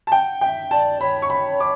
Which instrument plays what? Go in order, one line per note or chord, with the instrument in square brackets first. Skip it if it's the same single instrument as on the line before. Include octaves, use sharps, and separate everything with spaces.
[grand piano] A5
[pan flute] F#5 [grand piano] G5
[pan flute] E5 [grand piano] G5
[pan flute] D5 [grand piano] A5
[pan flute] C#5 [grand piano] B5
[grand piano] C#6
B5
D6